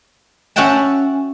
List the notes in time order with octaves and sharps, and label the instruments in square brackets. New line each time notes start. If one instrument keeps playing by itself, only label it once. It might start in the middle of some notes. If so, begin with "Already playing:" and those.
[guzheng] C#4 F#4 E5 F#5 G5 A5